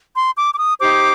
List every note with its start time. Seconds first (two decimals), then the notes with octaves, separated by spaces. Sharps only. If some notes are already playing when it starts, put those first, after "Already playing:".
0.14 C6
0.36 D6
0.53 D6
0.57 D#6
0.79 D#4 G4 C5 D6